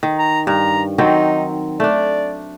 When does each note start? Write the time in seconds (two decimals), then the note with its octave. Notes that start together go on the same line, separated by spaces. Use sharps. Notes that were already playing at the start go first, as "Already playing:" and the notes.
0.03 D#3
0.19 A#5
0.47 G2 A#5
0.98 D#3 F#3 C4 D#4
1.80 A3 D4 D5